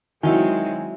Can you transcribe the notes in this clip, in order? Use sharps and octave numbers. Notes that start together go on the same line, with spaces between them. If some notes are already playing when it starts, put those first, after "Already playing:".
D#3 F#3 G#3 C4 E4 F#4 E5 G#5